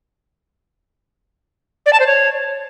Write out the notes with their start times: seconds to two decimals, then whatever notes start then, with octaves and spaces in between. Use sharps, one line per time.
1.86 D5
1.93 A5
2.00 C5
2.07 C#5